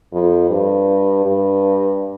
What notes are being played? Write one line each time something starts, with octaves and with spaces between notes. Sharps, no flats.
F2
G2
G2